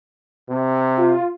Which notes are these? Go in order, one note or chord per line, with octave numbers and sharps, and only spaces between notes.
C3
F4